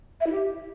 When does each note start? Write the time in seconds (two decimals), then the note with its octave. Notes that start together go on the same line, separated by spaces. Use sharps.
0.20 E5
0.26 E4
0.32 G4